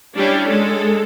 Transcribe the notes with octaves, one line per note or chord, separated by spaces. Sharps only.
G3 C#4 D4 E4
G#3 A4